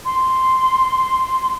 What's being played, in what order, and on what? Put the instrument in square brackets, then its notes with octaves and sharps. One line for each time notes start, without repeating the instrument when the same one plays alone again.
[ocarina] C6